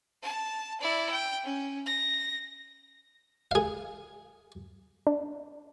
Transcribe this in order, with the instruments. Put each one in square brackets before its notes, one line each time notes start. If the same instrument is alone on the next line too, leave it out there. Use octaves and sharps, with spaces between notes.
[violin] A5
E4 D5
G5
C#4
A#6
[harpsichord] G#4 F5
[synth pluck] D4